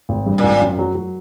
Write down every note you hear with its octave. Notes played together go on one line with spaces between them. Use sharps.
G#1
G2
A#2
G#1
F#2
F#3
F#3